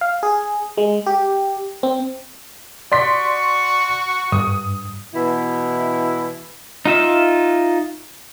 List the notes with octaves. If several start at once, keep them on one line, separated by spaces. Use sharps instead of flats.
F5
G#4
G#3
G4
C4
F#4 D5 C6 C#6 B6
G2 D#6
B2 E3 E4
D#4 F4 E5